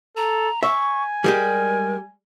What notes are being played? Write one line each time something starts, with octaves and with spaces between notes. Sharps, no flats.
A4 A#5
E5 G#5 C#6
G3 G#3 G4 A#4